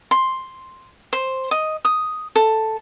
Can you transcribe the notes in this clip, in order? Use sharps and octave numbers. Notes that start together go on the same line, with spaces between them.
C6
C5
D#5
D#6
A4